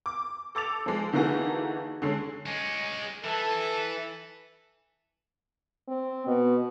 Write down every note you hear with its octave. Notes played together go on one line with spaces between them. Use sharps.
D6
A4 D6 A6 F7
F3 G#3
D3 E3 A#3 D#4 F#4 G#4
D3 G#3 C#4
G#3 C#4
E3 A4
C4
B2